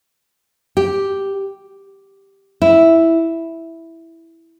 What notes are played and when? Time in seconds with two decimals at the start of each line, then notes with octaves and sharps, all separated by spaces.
0.77 G4
2.62 E4